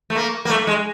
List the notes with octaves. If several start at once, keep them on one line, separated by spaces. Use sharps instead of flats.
A3
A#3
A#3
A3
G#3